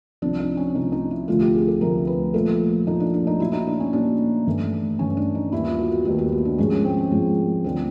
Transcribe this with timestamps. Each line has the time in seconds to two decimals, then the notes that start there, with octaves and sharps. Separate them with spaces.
0.22 C2 C3 F3 D4
0.40 D#4
0.57 C#4
0.75 C2 C3 F3 D#4
0.92 D#4
1.11 E4
1.28 D2 C3 F3 A3 F4
1.41 G4
1.54 G#4
1.68 A4
1.81 D2 C3 F3 A3 A#4
2.07 B4
2.34 A#2 F3 A3 A4
2.87 A#2 F3 A3 D#4
3.00 D4
3.14 D4
3.27 D#4
3.40 A#2 F#3 A#3 E4
3.53 D#4
3.67 D4
3.80 C#4
3.93 A#2 F#3 A#3 D4
4.46 G2 E3 A3
4.99 G2 E3 A3 C#4
5.17 D4
5.35 D#4
5.52 D#2 D#3 G3 B3 E4
5.65 F4
5.79 F#4
5.92 F#4
6.05 D#2 D#3 G3 B3 G4
6.18 G4
6.32 F#4
6.45 D4
6.58 G#2 F3 G#3 C#4
6.72 C#4
6.85 C4
6.98 C#4
7.11 G#2 F3 G#3
7.64 D2 D3 F3 C4